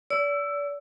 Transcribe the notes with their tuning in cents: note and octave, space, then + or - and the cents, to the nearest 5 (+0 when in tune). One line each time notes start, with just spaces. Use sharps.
D5 -35 E6 +15